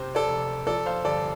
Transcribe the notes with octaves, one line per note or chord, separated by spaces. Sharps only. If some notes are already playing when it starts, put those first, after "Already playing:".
Already playing: C3 C5
A4 D5
F1
F3 A4 D5
C5 F5
G1 A4 D5